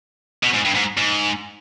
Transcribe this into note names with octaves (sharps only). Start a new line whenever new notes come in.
B2
G#2
G2
G#2
G#2